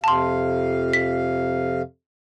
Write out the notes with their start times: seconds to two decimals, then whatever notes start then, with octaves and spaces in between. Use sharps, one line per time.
0.04 F2 C3 F5 A5 C6
0.93 B6